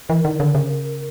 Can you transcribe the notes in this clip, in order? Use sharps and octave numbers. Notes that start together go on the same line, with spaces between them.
E3 A#4
D#3
D3
C#3